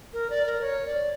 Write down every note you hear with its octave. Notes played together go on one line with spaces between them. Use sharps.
A#4
D5
A#4
C#5
D5